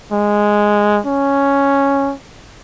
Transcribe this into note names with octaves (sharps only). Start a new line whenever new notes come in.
G#3
C#4